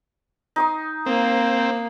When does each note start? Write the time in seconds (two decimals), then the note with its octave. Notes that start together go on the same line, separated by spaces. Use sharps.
0.56 D#4 C6 D#6
1.06 A#3 C4